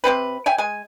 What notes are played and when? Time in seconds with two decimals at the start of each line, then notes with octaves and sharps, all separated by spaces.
0.04 C3 G#3 C4 B4
0.46 C#5 E5 G5 G#5
0.58 G#3 G#5